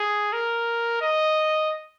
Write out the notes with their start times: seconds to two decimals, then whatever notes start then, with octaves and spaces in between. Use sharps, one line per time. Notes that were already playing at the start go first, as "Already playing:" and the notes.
Already playing: G#4
0.33 A#4
1.02 D#5